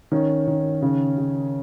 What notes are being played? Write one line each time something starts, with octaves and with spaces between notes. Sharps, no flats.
D#3 C#4
D#3
C#3
C#3